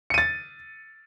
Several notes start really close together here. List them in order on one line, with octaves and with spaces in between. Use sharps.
C#7 D#7 A6